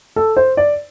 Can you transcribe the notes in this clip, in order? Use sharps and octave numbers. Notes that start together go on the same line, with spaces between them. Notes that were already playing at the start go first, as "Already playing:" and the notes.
A4
C5
D5